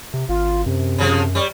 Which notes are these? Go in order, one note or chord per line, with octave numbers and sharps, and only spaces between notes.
C3
G#1 F4
F#2 C3
F#2 C#3 F3
G3 C#5